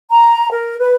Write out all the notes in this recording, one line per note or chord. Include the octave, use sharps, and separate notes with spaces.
A#5
A#4
B4